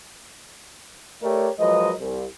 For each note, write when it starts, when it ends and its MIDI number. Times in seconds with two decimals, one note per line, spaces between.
1.23 1.49 57
1.23 1.49 67
1.23 1.49 70
1.23 1.49 73
1.23 1.49 74
1.59 1.92 53
1.59 1.92 54
1.59 1.92 56
1.59 1.92 70
1.59 1.92 71
1.59 1.92 75
1.99 2.25 36